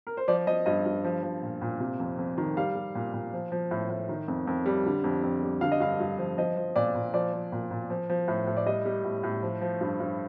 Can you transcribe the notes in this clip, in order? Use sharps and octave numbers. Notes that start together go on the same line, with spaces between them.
A#4
C5
F3 D5
F3 D#5
G2 D#5
G2
F3
F3
A#2
A#2
C3
F2
F2
D#3
G3 F5
G3
A#2
A#2
F3
F3
A2
A2
D#3
F2
F2
G3
D3
F2
F2
G3
D3 F5
D#5
G2 F5
G2
F3
F3 D#5
F3
A#2 D5
A#2
F3 D5
F3
A#2
A#2
F3
F3
A2
A2
D5
G3 D#5
G3
A2
A2
F3
F3
G2
G2